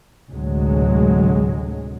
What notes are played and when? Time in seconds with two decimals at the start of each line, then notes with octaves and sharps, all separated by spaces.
0.30 A1 D2 C3 F#3 G#3